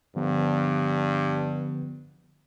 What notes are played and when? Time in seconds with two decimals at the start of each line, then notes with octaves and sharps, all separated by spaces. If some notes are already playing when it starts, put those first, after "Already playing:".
0.16 G2 D3 F3 B3